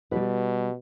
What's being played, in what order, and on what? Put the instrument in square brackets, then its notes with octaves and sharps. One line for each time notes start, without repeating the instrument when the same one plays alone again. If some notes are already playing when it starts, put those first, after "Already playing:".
[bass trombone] B2 [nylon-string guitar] G3 B4